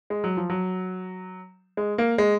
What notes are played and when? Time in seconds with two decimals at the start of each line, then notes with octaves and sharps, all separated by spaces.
0.10 G#3
0.24 F#3
0.37 F3
0.50 F#3
1.77 G#3
1.98 A#3
2.18 G#3